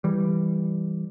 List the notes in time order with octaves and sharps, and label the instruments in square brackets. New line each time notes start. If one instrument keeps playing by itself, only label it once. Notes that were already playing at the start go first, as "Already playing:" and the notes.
[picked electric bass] E3 G3